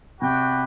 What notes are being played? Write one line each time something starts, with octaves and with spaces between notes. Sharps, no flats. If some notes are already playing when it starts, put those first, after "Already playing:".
C3 F#4 B4 D5 G5